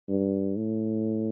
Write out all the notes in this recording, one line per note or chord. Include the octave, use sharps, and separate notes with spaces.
G2
A2